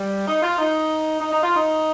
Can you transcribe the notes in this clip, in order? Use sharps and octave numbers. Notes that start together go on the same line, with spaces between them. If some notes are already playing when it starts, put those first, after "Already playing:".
Already playing: G3
D#4
F4
D#4
D#4
D#4
F4
D#4